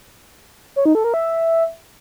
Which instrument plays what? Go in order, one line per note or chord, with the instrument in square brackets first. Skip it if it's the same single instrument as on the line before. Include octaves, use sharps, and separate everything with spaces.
[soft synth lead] C#5
D#4
A4
A#4
E5